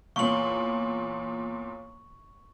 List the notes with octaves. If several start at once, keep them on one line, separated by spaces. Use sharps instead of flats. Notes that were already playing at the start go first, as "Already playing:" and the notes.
E2 A#2 C#5 F5 C#6 F#7